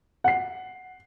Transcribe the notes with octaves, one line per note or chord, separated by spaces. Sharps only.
F#5 C7